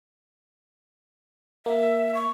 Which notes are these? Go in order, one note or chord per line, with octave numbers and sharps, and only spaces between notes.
A#3 E5
C#6